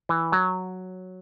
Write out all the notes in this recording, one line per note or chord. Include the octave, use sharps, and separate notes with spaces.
E3
F#3